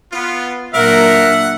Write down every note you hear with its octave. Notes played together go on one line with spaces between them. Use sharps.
B3 F4
A#2 F#3 D4 A#4 E5 F#5